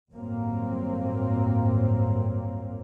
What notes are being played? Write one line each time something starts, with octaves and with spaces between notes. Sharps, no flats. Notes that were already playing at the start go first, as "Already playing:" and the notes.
G1 D#2 A2 F#3 A#3 C4